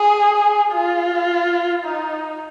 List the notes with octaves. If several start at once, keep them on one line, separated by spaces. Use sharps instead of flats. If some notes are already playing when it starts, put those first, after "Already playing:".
Already playing: G#4
F4
D#4